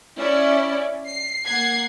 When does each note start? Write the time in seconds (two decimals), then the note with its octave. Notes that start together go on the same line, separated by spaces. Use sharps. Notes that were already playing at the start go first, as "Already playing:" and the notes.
0.20 C#4 E4 D5
1.09 C7
1.47 A#3 F#5 G#6 C7